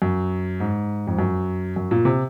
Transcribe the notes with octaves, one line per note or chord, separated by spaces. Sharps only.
F#2
G#2
F2
F#2
F#2
A#2
C3